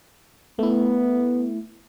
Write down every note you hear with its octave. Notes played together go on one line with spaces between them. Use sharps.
A3 B3 E4